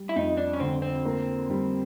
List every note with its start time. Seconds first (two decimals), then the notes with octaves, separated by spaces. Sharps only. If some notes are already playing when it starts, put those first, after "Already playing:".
Already playing: G3
0.09 E4
0.16 F2 D#4
0.37 D4
0.53 C#4
0.60 D3 C4
0.82 C4
1.05 A#3
1.50 G3